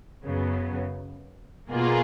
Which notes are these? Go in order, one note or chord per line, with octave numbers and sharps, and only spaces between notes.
F#2 C#3 F#3 B3
B2 A#3 F4 G#4